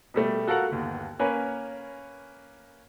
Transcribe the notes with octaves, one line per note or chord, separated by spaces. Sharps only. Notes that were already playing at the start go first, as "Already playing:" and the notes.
B2 G3 A3
F#4 A4 A#4 F5 F#5
G1 D#2
A#3 C#4 A#4 B4 C#5 G#5